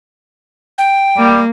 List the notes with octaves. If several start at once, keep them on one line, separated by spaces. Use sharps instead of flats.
G5
G3 A#3